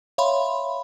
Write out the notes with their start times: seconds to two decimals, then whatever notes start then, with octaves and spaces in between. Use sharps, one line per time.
0.18 C#5 E5 F5 B5 C6